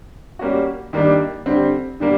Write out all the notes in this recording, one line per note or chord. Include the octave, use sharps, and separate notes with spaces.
G3 A#3 C#4 F#4
D#3 G3 A#3 D4
D3 G3 C4
D3 G3 A#3